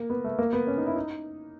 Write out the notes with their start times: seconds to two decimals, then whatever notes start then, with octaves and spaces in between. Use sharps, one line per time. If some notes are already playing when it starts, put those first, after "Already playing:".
Already playing: A#3
0.10 B3
0.24 A3
0.39 A#3
0.53 B3
0.67 C#4
0.78 D#4
0.87 E4
0.96 D#4